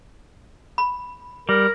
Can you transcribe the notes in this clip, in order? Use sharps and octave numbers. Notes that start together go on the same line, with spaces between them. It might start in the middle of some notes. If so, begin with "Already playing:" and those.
B5
G3 A#4